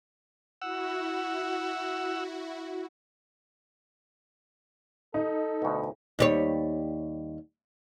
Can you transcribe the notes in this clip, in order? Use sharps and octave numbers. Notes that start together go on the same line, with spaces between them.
E4 F#4 F#5 E6
D#4 A4
D2 B2
D#2 G3 C#5